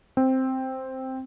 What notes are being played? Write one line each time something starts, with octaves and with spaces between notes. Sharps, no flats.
C4